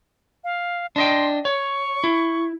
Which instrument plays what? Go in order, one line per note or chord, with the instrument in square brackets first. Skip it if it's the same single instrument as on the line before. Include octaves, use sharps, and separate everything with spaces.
[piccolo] F5
[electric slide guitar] D4 D#5 G5 [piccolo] C6
[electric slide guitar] C#5 [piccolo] C#6
[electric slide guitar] E4